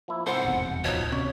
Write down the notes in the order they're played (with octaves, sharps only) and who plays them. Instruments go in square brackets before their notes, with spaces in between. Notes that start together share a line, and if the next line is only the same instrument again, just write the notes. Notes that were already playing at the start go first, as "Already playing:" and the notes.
[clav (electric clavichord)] F3 A#3 E4
[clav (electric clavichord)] C2 G#2 [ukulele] C5 [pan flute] F#5
[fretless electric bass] F1 E2 B2
[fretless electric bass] D1 [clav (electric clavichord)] B2 F3 D#4 [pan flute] C#5
[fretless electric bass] C3 [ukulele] C#4 [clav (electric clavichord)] D5